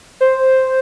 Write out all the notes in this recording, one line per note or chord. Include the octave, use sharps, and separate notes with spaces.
C5